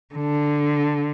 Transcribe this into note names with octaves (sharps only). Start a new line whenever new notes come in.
D3